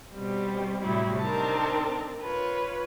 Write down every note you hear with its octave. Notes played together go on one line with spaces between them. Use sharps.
B2 G3 C4
A2 C3 F#3 G3 E4
C4 D4 D#4 A#4 A5
F4 B4 C#5